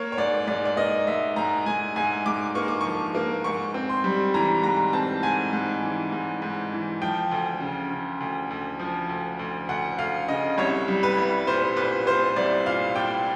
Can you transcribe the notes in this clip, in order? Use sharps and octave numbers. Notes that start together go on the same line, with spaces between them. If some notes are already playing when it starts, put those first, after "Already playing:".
Already playing: A#3 C#5
C#5
G#2 D5
G#2 D5
D5
A#3 D#5
G#2 E5
G#2 A#5
G#2 G#5
G#2 G#5
G#2 D6
A#3 C#6
D6
F3 C#6
A#3
G#2 C#6
C4
C6
G3
E3 A#5
G#2 A#5
C4 A5
G#2 G#5
G#2
E3
G#2
G#2
E3
F3 G5
D2
C#3
C#3
D2
D2
F3
D2
D2
D2 F#5
D2 F5
C#3 D#5
C2 C#5
G3
B4
C2
A#2 C5
A#2 B4
A#2 C5
C2 D5
A#2 F5
A#2 G5